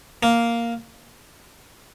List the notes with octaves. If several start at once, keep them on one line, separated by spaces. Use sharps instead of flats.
A#3